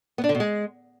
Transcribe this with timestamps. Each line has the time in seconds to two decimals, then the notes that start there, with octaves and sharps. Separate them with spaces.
0.18 B3
0.24 D4
0.29 D3
0.35 B2
0.40 G#3